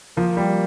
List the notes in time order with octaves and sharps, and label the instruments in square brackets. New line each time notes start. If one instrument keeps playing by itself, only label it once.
[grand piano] F3 [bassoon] A#3
[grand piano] G3